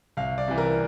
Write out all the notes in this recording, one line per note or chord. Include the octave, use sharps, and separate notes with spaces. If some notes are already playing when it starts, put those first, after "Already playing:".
C2 F5
D5
C3 E3
A#4